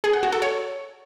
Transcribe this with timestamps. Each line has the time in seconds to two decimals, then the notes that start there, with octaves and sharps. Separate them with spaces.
0.04 G#4
0.13 F#5
0.23 F#4
0.32 A4
0.42 C#5